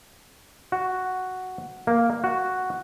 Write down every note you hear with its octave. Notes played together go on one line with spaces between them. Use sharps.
F#4
A#3
F#4